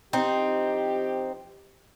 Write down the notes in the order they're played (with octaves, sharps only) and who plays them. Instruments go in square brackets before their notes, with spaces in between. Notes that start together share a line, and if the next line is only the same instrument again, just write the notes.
[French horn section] F3 E4 G4 [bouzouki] C4 D#4